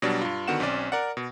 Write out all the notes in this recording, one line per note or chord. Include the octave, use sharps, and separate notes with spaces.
B2 F#3 G3 D4
G2 F4
D3 D#3 B3 F#4 F#5 E7
B1 C4 C#4 D5
A#4 D5 F#5
B2